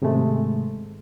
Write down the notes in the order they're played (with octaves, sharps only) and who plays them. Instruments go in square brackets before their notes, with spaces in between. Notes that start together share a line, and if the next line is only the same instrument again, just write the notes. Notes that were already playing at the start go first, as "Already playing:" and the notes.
[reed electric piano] G#2 C3 D#3 G#3 A3